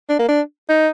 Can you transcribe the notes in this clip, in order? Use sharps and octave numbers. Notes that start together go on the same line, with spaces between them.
D4
A#3
D4
D#4